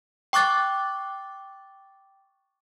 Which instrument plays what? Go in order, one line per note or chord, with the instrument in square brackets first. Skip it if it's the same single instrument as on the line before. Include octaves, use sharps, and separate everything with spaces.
[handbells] G5 C#6 D6 F#6 A6